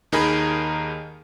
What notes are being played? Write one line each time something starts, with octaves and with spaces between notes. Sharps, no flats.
D#2 D#4 G#4 A#4 G#5 B5